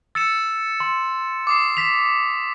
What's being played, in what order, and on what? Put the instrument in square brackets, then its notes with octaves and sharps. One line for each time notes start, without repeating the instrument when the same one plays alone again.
[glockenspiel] E6 [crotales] A6 C#7 E7
[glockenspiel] C6
[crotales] D6 D#6 C7
[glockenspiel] B6 F7